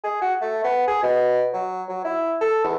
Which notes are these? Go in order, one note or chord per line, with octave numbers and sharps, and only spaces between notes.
G#4
F#4
A3
B3
G#4
B2
F#3
F#3
E4
A4
E2